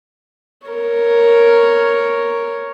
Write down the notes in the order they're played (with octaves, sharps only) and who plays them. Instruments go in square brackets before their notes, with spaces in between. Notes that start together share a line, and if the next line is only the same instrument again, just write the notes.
[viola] A#4 C#5